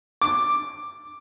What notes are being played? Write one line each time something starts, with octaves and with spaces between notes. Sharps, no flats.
D6